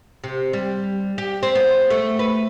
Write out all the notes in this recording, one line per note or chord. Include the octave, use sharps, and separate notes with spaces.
C3
G3
G4
C4
B3
A3
B4